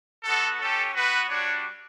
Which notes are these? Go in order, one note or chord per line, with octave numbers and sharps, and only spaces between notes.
B3 F#4 A4
C#4 G4 A4
B3 F#4 B4
G3 D4 F#4 C#5